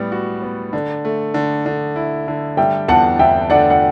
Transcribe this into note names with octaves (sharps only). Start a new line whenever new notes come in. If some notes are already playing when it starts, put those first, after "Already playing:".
Already playing: A2 G3 B3
F#4
B3
D3 D5
A3
D3
D3
E4
D3
G3 E5 G5
E2 F#5 A5
E2 E5 G5
D3 D5 F#5
F#5